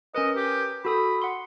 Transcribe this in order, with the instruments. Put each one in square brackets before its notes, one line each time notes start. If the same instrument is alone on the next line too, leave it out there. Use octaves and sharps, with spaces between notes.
[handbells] C#4 A#4 B4 [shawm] D#5
[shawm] G4
[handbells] F#4 A4 D#6 [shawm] B5
[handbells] F#5 C6